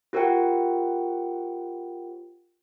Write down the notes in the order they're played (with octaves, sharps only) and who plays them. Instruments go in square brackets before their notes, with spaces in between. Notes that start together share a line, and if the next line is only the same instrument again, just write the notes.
[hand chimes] F4 G4 A#4 C5 F#5 G5